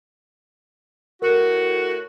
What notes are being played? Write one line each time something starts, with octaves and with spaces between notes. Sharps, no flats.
A2 F#4 A#4